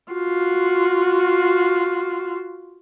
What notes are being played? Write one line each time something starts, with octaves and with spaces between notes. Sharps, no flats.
F4 F#4